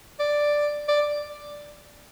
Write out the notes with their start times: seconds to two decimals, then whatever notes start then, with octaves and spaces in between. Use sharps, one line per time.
0.19 D5
0.88 D5